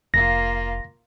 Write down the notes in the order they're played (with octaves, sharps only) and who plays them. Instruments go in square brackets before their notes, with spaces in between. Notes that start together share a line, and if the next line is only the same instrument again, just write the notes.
[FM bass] F1 [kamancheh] A#3 F4 [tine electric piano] A#6